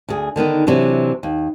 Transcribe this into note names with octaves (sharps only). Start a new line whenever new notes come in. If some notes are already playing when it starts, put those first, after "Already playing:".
D2 G#4
D3 D#3 B3 D#4
C3 E3 F#3 D4
D#2